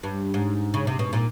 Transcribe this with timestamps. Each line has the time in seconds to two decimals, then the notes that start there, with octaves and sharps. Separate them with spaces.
0.03 G2
0.34 G#2
0.74 C#3
0.87 C3
0.99 B2
1.13 A#2